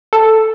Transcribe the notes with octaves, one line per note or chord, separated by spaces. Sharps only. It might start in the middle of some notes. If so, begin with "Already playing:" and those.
A4